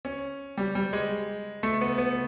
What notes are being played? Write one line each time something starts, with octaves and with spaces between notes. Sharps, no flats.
C#4
G3
G3
G#3
A3
B3
B3